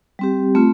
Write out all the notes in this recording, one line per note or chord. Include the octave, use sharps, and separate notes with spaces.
G3 C4 G4
A3 C4 F4